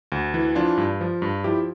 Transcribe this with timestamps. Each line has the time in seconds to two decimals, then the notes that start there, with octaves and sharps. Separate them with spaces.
0.12 D2
0.34 E3
0.55 F3 D4 F4
0.77 G2
1.01 F3
1.22 G2
1.44 F3 E4 G4